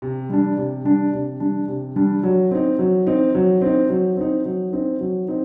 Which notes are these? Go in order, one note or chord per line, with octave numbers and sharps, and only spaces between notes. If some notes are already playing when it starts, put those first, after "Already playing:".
C3
G3 D4
C3
G3 D4
C3
G3 D4
C3
G3 D4
F#3
C4 D#4
F#3
C4 D#4
F#3
C4 D#4
F#3
C4 D#4
F#3
C4 D#4
F#3
C4 D#4